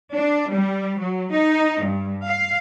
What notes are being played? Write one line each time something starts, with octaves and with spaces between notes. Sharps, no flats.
D4
G3
F#3
D#4
G2
F5